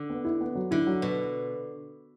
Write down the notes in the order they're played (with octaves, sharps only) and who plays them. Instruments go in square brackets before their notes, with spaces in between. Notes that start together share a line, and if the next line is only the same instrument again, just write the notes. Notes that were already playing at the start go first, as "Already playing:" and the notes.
Already playing: [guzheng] D3
[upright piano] B3
E4
B3
F#3
[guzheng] D3 [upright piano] E4
[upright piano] F#3
[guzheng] B2 [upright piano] B4